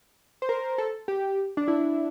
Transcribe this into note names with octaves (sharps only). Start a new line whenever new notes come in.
C5
A#4
A4
G4
D4
E4